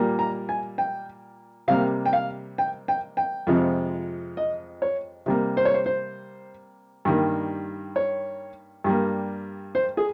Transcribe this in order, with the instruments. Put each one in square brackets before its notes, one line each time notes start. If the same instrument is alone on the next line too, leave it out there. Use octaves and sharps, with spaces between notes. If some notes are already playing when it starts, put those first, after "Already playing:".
Already playing: [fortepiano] A#2 G3 A#3
A#5
G#5
G5
C3 G3 A#3 F5
G5
F5
G5
G5
G5
F2 C3 F3 G#3
D#5
C#5
C3 G3 A#3
C5
C#5
C5
C5
G2 D#3 G3 A#3
C#5
G2 G3 A#3
C5
G#4